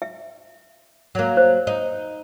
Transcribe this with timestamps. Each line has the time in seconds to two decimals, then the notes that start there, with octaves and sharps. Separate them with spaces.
0.02 E5
1.15 F#3 A#3
1.37 C5
1.67 D#4